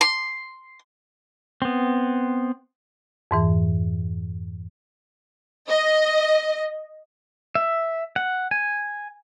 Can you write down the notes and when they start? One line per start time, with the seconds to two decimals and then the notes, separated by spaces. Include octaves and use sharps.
0.01 C6
1.62 B3 C4
3.31 F2 G#2 E3
5.69 D#5
7.55 E5
8.16 F#5
8.51 G#5